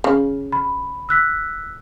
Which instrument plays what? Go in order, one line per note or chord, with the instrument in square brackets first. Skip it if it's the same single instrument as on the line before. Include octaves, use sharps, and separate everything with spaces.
[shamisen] C#3
[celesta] B5
E6 F#6 B6